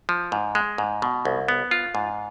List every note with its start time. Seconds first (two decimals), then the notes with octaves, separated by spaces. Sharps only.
0.09 F3
0.32 G#2
0.55 G#3
0.78 G#2
1.02 B2
1.25 C2
1.48 B3
1.71 F4
1.95 G#2